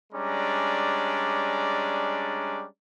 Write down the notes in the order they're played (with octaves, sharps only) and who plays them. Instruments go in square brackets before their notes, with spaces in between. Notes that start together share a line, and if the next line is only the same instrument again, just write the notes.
[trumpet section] G3 G#3 C#4 D4 D5 A#5